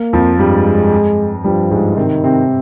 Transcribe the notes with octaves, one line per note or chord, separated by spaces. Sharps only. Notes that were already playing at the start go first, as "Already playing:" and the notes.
Already playing: A#3
F2 F3
G2 G3 G#3
G2 F3 G3
G#2 G#3
C3 D#3 C4
C3 C4